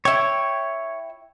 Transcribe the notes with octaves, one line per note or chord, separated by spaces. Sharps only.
E4 C#5 G5